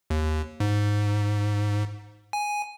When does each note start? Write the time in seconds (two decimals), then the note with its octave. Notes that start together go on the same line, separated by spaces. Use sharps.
0.10 D#2
0.60 G#2
2.33 G#5